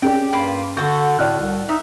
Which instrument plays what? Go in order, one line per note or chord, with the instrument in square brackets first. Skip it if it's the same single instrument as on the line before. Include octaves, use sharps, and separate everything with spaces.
[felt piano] C#4 G#4 D5 [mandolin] G4 G5
[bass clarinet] G2 [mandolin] A#3 F4 B5
[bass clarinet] D3 [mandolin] F#4 A4 [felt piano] G6
[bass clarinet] A2 [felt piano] D5 F6 F#6
[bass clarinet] C2
[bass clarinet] D#4 [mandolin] E5